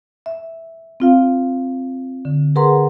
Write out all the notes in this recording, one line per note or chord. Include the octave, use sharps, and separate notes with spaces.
E5
C4 F4 F5
D3
G#4 A#4 B4 F#5 A#5 C6